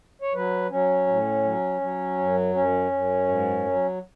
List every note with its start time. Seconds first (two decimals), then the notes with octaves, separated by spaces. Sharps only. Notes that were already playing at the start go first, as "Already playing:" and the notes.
0.22 C#5
0.34 F#3 B4
0.70 F#3 C#4
1.07 A2
1.44 F#3
1.81 F#3
2.18 F#2
2.54 F#2 C#4
2.92 F#2
3.28 G#2
3.65 F#3